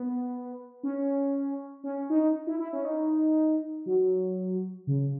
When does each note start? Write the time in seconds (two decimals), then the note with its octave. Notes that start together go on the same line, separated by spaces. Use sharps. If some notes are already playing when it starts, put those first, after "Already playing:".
Already playing: B3
0.83 C#4
1.84 C#4
2.10 D#4
2.47 E4
2.60 E4
2.73 C#4
2.85 D#4
3.86 F#3
4.87 C#3